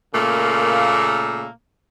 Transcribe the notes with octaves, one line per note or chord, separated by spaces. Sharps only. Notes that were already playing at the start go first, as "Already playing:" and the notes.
A#2 C#3 A3 A#3